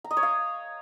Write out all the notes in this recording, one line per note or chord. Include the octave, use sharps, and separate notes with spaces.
A#5
D#5
C#5
F5